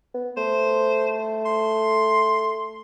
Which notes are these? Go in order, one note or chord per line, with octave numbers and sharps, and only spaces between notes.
B3
A3 C5
C6